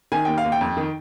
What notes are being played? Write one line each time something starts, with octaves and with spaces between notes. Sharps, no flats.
D#3 G#5
D#2 G5
F5
D#2
G5
F2
D#3